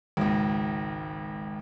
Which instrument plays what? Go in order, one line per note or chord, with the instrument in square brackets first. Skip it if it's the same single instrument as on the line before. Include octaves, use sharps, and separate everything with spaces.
[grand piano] G#1 C#2